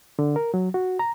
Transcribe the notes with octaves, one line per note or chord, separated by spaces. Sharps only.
D3
A#4
F#3
F#4
A#5